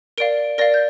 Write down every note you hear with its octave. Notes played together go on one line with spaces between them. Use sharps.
A#4 D5 F5 D7
A#4 D5 F5 A#6
G6